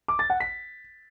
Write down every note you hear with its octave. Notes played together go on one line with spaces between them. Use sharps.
D6
A6
F#5
B6